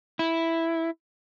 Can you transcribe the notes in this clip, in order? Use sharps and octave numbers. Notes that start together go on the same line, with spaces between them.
E4